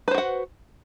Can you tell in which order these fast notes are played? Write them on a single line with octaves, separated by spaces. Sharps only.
B4 C5 F#4 F#5